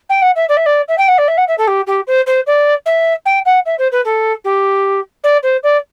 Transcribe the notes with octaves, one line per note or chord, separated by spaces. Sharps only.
G5
F#5
E5
D5
E5
D5
E5
G5
F#5
D5
E5
F#5
E5
A4
G4
G4
C5
C5
D5
E5
G5
F#5
E5
C5
B4
A4
G4
D5
C5
D5